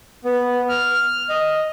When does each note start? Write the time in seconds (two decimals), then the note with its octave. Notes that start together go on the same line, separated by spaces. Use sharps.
0.25 B3
0.69 F6
1.29 D#5